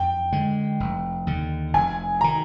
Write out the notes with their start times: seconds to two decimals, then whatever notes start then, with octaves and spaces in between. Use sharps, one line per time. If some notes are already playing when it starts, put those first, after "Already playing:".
Already playing: F2 G5
0.32 D3 G#3
0.80 F1
1.27 D#2 D3
1.74 F1 G#5
2.21 D#3 A#5